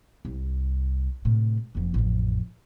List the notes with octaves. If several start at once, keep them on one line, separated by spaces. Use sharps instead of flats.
C2
A2 C3
F#1 F2
A1 F2